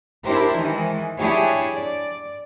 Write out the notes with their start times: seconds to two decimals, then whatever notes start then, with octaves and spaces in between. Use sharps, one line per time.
0.24 D4 E4 G4 A#4 C5
0.57 D#3 E3 G#3
1.19 D4 E4 G4 G#4 C#5
1.76 D5